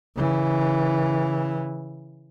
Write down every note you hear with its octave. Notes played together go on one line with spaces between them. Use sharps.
C#3 E3